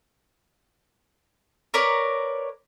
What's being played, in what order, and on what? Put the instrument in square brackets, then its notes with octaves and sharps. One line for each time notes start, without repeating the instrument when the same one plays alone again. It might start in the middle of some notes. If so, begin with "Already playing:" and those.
[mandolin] A#4 B4 C#5 D5